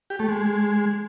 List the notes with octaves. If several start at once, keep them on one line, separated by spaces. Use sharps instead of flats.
G4
A3
G#3